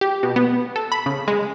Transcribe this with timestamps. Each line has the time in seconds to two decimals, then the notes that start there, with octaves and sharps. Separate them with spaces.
0.01 G4
0.23 B2
0.36 B3
0.76 A4
0.92 B5
1.06 C#3
1.28 G#3